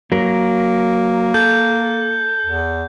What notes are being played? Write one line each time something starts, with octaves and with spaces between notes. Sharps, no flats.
F#3 A#3 A#4
A4 G6
E2